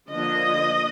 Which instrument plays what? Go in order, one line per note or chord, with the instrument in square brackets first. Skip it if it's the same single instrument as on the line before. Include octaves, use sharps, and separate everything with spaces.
[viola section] D3 F3 A#3 D4 D#5